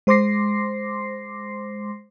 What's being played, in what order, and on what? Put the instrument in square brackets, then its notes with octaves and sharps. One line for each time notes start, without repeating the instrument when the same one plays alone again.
[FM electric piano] G#3 C5 C6 D6 A#6 C7